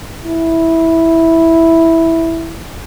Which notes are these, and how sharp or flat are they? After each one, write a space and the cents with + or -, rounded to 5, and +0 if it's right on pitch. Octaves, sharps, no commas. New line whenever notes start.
E4 -5